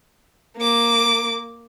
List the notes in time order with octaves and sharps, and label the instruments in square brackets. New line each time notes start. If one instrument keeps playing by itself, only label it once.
[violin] A#3 D6